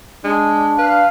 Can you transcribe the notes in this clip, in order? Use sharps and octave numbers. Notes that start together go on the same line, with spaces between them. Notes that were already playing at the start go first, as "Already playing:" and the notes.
G#3 D4
B4 F5